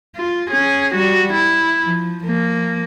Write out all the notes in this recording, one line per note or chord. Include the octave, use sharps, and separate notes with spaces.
F4
C#4 G#4
G3 F#4
E4
F3
F3 A#3